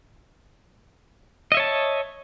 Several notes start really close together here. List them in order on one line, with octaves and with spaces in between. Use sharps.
D#5 E5 C#5 A5